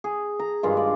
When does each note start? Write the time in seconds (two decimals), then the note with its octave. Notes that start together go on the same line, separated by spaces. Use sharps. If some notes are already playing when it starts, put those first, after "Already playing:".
0.04 G#4
0.39 A#5
0.63 G2 D#3 G#3 F4
0.77 D5